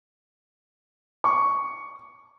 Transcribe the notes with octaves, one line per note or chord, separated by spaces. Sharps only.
C#6